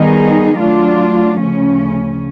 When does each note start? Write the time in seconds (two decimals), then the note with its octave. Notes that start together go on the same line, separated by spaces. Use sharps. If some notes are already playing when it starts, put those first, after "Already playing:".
Already playing: D#3 G3 B3 D#4 G#4
0.58 F#3 A3 D4 F4
1.38 D2 C#3 F3 A3 C#4